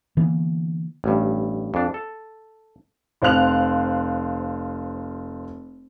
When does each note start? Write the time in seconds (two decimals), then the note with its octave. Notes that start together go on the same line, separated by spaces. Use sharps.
0.17 D3 E3 A#3 B3
1.04 A1 G2
1.74 F2 D4
1.94 A4
3.22 F1 C5 F5 F#6 F7